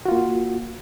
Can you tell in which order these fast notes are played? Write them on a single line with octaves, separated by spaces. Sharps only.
F#4 F4 A#3